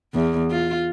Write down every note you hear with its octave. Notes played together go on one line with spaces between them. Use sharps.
E2
F4